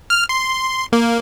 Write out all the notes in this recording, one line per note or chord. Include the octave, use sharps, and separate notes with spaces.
F6
C6
A#3